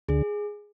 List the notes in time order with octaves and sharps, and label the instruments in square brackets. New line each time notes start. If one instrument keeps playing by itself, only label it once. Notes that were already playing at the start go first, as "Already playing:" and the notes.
[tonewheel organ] D2 D3 [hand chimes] G#4